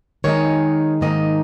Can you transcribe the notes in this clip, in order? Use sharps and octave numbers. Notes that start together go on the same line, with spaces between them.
D#3 G#3 D#4 C#5
G#2 D#3 A#3 D#4 D#5